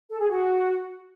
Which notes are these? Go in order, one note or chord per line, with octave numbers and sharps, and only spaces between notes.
A4
G#4
F#4